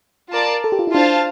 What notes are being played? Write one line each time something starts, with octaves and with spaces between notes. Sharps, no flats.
F4 A#4 D5 A5
A4
G4
F4
E4
D4 F4 C5 F5 A5